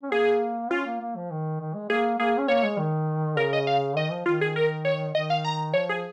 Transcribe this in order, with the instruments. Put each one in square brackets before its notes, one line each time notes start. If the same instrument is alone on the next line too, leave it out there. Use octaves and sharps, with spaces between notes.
[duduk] C#4
[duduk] A#3 [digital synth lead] G#4
[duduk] C#4 [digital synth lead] F4
[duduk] A#3
A#3
F3
D#3
D#3
G#3
[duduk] A#3 [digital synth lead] G#4
[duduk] A#3 [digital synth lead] G#4
[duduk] C#4
[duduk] A#3 [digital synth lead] C#5
[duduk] G#3
D#3
[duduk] C#3 [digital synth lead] A#4
[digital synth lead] D#5
F5
[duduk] D#3 [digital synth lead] D#5
[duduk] F3
[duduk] D#3 [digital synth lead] F4
[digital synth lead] G#4
A#4
C#5
[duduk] D#3 [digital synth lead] D#5
[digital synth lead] F5
A#5
[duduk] F3 [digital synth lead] C#5
[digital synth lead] G#4